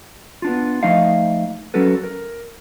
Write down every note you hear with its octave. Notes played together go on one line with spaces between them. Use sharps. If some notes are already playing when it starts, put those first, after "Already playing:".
B3 D4 F4
F3 A3 D#4 D#5 F5
F#3 C#4 F#4 A4 B4
A#4